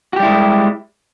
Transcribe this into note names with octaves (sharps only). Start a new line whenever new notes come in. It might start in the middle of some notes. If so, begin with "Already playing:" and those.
G3 G#3 E4 F#4 G4